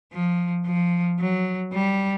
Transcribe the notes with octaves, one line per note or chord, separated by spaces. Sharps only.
F3
F3
F#3
G3